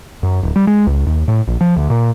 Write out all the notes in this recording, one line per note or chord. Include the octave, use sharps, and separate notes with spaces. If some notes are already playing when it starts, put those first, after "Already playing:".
F#2
D1
G3
G#3
C#2
D#2
A2
A#1
F3
D2
A#2